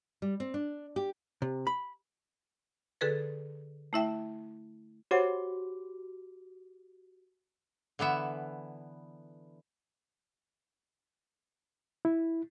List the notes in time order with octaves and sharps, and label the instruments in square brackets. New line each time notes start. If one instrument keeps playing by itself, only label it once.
[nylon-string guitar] G3
C4
D4
G4
[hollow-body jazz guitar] C3
B5
[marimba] D3 G#4 A4 B4 A6
A3 E4 E5 G5
[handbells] F#4 G4 D6 [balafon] C5 C#5 F#5
[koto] D3 E3 B3 E5
[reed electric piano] E4